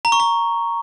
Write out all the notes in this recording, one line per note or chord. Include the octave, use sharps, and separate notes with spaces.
A#5
C#6
A#5